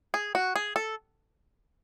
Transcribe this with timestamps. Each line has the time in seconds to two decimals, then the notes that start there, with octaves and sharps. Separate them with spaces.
0.14 G#4
0.35 F#4
0.56 G#4
0.76 A4